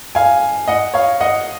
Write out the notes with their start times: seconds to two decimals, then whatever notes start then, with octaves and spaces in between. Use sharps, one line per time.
0.15 F5 G#5
0.68 D#5 F#5
0.94 C#5 F5
1.21 D#5 F#5